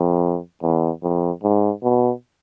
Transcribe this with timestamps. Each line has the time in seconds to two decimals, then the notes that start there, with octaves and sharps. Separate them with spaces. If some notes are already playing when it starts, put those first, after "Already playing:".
Already playing: F2
0.62 E2
1.03 F2
1.43 G#2
1.83 B2